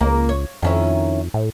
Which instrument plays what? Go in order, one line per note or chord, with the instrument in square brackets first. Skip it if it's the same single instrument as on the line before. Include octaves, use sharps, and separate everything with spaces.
[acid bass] C#2 [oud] A#3
[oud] C#5
[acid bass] F2 [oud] D#3 C#4 E4
[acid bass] A2